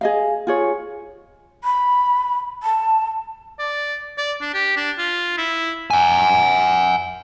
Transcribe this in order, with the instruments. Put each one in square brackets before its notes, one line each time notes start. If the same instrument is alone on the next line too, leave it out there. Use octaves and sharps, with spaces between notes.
[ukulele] G#4 D#5 F5
F4 G#4 C#5
[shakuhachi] B5
A5
[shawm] D5
D5
D4
G4
D4
F4
E4
[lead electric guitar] F#5 G#5